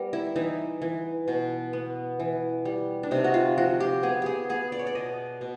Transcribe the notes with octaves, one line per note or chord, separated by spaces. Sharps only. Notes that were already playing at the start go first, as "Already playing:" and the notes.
Already playing: G3 B3 A#4
E4
E3 D#4
E3
B2
B3
E3
G3
D4
C3 D#4
F#4
F4
F3 F#4
G4
B3 G#4
G4 G#4
B3 G#4
D5
C#5
D5
B2 D#5
B2